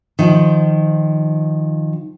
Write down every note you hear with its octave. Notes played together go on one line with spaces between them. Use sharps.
D#3 F3